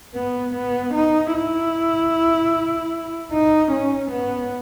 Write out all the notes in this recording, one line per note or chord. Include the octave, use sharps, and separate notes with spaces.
B3
B3
D#4
E4
D#4
C#4
B3